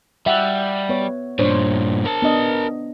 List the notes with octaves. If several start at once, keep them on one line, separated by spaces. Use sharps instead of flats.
G3 E5 F#5
B3 C#5
G2 A#2 D4 C5 C#5
A#4 A5
B3 D4 D#5